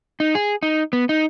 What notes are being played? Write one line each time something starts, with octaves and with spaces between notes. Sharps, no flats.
D#4
G#4
D#4
B3
D#4